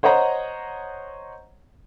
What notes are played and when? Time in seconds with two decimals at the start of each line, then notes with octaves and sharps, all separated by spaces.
0.03 C5 C#5 D#5 F#5 A#5